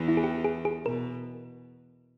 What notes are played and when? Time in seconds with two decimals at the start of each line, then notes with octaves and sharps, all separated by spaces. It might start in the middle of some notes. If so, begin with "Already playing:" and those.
Already playing: E2 E3
0.08 E4
0.17 G#4
0.24 G4
0.44 G#4
0.65 G#4
0.86 B2 A#4